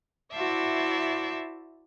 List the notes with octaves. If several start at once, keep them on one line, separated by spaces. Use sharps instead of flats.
E4 F#4 C5 D5 E5 A5